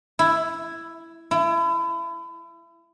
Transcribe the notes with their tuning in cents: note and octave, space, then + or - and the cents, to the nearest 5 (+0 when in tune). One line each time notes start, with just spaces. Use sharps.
E4 +10
E4 +35